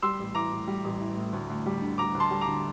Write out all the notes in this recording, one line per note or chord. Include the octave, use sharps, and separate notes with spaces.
G3 C6 E6
A1
E3 A#5 D6
A2
G3
A1
E3
A2
D2
D2
G3
D3
D2 A#5 D6
D2
A5 C6
G3
A#5 D6
D3